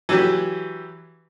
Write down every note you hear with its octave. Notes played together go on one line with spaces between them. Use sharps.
E3 F#3 G4